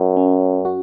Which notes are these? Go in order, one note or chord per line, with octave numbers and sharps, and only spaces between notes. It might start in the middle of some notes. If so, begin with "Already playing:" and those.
Already playing: F#2
C#4
F#4